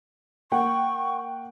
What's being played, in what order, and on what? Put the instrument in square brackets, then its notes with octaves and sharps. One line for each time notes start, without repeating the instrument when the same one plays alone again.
[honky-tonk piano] A#3 F#5 G5 [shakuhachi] C#6